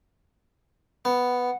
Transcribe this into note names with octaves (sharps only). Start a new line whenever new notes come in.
B3 F#5